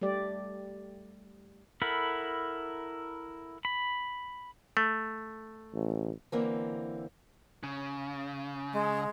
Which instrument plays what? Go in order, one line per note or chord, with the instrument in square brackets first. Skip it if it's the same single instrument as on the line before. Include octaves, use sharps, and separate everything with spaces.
[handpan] G3 A3 G4 D5
[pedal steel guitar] E4 A4 A#4 F#5 B5
B5
[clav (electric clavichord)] A3
[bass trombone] A1
[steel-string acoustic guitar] D3 E3 A#3 C4
[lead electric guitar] C#3
[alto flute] G#3